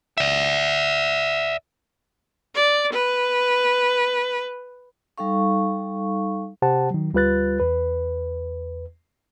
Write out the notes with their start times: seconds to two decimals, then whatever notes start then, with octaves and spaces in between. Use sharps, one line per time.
0.18 D5 E5
2.55 D5
2.93 B4
5.18 G3 D#4 A4 F5 C#6
6.62 C3 G4 C5 F#5 A5
6.91 D#3 F#3
7.14 D2 G3 F4 B4 F#6 A6
7.60 E2 B4